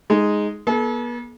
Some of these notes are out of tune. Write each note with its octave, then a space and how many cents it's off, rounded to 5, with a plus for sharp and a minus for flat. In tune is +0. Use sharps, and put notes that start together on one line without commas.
G#3 +0 D#4 +0
B3 -45 A4 -35